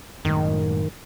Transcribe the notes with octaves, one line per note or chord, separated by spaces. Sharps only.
F#2 A2 D#3 G#3